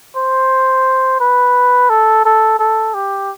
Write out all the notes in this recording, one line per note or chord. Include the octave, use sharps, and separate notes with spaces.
C5
B4
A4
A4
A4
G4